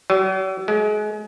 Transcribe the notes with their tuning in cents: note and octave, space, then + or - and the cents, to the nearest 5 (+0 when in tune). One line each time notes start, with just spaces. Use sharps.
F#3 +45
G#3 +30